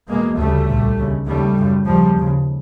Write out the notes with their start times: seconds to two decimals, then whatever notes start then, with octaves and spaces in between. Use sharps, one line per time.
0.08 E2 B2 G#3 A#3
0.37 D2 C#3 G3 A3
0.68 C2 A#2
0.97 D#2 C#3
1.26 D#2 C#3 G3 A3
1.57 F#2 C#3
1.86 D#2 C#3 F3 G3
2.16 D#2 C#3